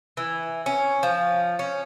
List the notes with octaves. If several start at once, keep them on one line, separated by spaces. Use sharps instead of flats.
E3
C#4
F3
C#4